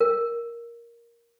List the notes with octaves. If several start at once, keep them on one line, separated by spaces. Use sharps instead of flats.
A#4